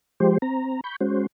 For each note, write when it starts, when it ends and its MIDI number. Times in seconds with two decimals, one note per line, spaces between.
0.20 0.38 53
0.20 0.38 56
0.20 0.38 67
0.20 0.38 72
0.42 0.80 60
0.42 0.80 82
0.84 0.96 83
0.84 0.96 85
0.84 0.96 91
1.00 1.26 56
1.00 1.26 61
1.00 1.26 66
1.00 1.26 72